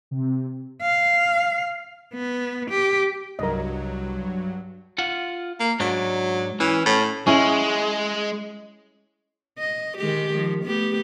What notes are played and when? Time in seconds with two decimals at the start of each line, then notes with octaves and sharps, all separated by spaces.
0.11 C3
0.82 F5
2.14 B3
2.70 G4
3.39 C2 G2 F#3 A#4 D#5
4.98 F4 F#5
5.60 A#3
5.80 G#2 F#3 D4
6.60 E3 C#4
6.86 A2
7.27 G#3 C#4 E4 F#5
9.58 D#5
9.98 D#3 G#3 G4
10.33 D#3 F3
10.64 A3 B3 G4